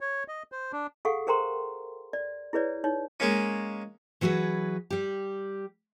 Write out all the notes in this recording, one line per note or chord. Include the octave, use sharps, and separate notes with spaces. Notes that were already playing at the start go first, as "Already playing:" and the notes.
C#5
D#5
C5
D4
G#4 A4 F5 F#5 C#6
G#4 A#4 C5 G5 A#5 C6
D5
E4 G#4 B4 C#5 D5
D#4 C#5
G#3 A#3 C#4
E3 F#3 F#4 G#4 B4
G3 G4